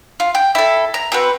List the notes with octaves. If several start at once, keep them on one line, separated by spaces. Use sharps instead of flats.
F4
G5
E4 A4
A#5
C4 F#4 B4